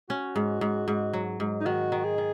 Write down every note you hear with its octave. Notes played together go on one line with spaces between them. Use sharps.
C#4 F#4
G#2
G#2
G#2
F#3
G#2
D#4
D#3 F#4
D#3
G#4
D#3